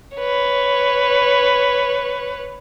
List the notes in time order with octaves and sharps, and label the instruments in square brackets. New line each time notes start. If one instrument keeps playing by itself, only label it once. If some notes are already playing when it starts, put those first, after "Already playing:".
[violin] B4 C#5